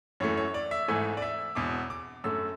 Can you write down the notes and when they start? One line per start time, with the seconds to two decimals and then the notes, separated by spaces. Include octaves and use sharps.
0.20 F#2 E3 A3 C#5
0.37 C#5
0.54 D5
0.71 E5
0.88 G#1 G#2 E3 A3 G#5
1.17 D5
1.22 E5
1.55 E1 E2 B2 D6
1.90 D6
2.24 F#2 D3 A3 E6